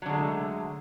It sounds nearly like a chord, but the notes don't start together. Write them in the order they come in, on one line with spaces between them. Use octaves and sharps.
F#3 D3 G#3 A3